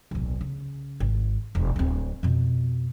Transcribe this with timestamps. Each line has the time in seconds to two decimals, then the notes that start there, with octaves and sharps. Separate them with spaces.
0.11 D1 B1
0.41 C#3
1.00 G#1
1.55 E1
1.76 D1 C4
2.23 F2 B2